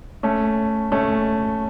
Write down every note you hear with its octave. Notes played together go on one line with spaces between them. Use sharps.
A3 C#4
A3 C#4